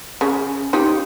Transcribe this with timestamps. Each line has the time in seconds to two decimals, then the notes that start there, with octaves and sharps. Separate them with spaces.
0.21 C#3
0.73 D#4 F4 G4